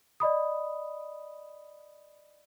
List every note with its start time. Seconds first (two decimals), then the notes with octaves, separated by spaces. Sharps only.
0.20 D5 D#5 B5 D#6